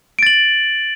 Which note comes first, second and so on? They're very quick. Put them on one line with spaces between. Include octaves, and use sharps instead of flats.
D7 A6 F#7